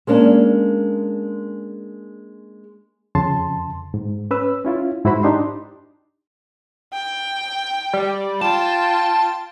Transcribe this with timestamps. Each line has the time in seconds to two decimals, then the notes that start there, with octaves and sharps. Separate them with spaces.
0.07 G#3 A#3 C#4 D4
3.15 F2 C#3 A5 C6
3.94 G#2
4.31 C#4 B4 E6
4.65 C#4 E4 F4
5.04 G#2 E4 F#4 C5 B5
5.23 D4 D#4 G4 C6
6.93 G5
7.93 G3
8.41 F4 G5 A5